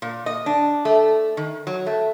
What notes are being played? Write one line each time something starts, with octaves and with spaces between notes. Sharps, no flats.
A#2
D#5
D4
A3
D#3
F#3
A3